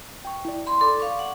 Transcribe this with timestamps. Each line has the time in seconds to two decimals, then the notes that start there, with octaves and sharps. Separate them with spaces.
0.25 G5 C#6
0.45 E4 D5
0.67 B5 C6
0.81 A4 D5 D6
1.00 F5 C#6
1.19 F#5